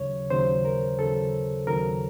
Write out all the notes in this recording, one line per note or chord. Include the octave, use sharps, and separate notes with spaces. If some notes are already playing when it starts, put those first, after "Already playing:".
Already playing: D#2 C#3 F#3 C#5
D#2 C#3 F#3 C5
A#4
D#2 C#3 F#3 A4
D#2 C#3 F#3 A#4